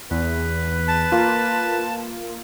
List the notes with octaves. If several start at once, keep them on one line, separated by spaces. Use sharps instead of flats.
E2 B4
A5
A#3 F4